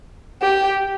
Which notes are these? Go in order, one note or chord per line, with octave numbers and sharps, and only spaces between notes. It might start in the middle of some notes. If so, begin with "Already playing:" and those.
G4